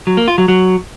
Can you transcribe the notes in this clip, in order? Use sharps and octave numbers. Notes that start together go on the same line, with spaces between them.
F#3
A#3
F4
F#3
F#3